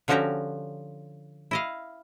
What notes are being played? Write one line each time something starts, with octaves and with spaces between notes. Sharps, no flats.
D3 F3 C#4 F#4 G4 A#5
E4 D#5 F5